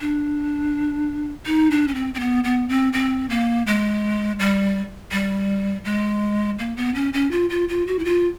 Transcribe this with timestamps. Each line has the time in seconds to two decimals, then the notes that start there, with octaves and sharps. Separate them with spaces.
0.01 D4
1.46 D#4
1.71 D4
1.88 C#4
1.95 C4
2.14 C4
2.20 B3
2.44 B3
2.69 C4
2.93 C4
3.30 A#3
3.67 G#3
4.39 G3
5.12 G3
5.85 G#3
6.59 A#3
6.77 B3
6.95 C#4
7.13 C#4
7.31 F4
7.50 F4
7.69 F4
7.87 F#4
7.99 E4
8.05 F4